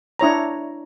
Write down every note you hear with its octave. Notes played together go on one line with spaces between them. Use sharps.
D4 E4 C#5 A#5